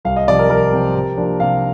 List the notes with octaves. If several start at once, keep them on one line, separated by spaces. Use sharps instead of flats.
C2 F5
D#5
C3 F3 C4 D5
A#4
C2 A#4
C3 F3 C4
C3
F3 A#3 D4
C3 F5